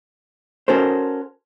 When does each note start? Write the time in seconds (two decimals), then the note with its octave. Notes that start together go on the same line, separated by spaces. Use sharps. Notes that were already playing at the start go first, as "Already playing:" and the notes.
0.68 C#4 F#4 A4 A#4 C5